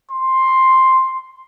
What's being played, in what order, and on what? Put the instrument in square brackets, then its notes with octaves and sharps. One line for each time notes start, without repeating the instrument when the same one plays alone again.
[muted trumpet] C6